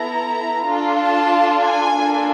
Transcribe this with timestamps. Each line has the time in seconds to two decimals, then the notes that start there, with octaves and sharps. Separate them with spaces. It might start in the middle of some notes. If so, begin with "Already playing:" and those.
Already playing: B3 E4 A4 A#5
0.65 D4 F4 A4
0.98 A5
1.62 G#5
1.95 A#3 D4 F4 A4